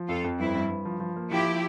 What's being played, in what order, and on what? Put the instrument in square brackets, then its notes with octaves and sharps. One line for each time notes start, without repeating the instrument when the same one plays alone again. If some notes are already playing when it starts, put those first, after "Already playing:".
Already playing: [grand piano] F3
[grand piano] F2 [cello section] F4 A4
[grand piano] F2
[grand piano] G2 [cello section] C4 E4
[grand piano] G2
G2
F3
F3
A#3
[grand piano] F3 [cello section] E4 G4
[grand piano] F3